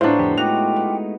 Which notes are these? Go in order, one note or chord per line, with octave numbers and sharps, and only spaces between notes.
A2 B3 D4 F4 C5 A#5 C#6
F2 D3 G4
G#3 A3 D#4 F4 F#4 G5 D6 F7
B3